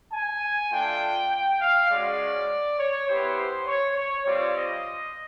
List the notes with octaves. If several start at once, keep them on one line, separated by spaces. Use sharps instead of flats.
G#5
A3 D4 F4 G5
G5
F5
G#3 C#4 F#4 D5
C#5
B3 E4 G4 C5
C5
C#5
C#5
G3 C4 F4 D5
D#5